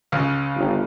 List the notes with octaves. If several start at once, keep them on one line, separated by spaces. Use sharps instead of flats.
C#2 C#3
G1